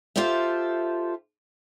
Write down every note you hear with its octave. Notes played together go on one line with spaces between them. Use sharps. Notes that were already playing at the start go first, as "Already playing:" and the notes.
F4 G4 A4 C5 E5